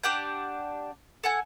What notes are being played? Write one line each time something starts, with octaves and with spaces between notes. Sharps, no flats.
D4 G4 F#5 G6
A4 F#5 G#5